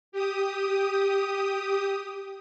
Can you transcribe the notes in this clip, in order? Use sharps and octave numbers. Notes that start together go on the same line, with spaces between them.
G4 D#6